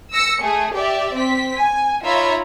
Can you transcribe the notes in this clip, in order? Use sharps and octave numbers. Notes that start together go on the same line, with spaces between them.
E6 A#6 C#7
A3 G#4
G4 D5 E5
C4 B6
G#5
D#4 F4 C#5 E5 A#5 B5